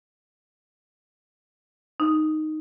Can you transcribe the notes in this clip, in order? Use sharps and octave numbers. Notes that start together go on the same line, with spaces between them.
D#4